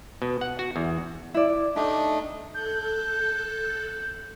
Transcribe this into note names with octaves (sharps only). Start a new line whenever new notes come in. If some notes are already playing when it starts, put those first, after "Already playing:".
B2
F#5
F#4
E2
E4 D5
A3 D4 D#4 G4
A4 F#6 G6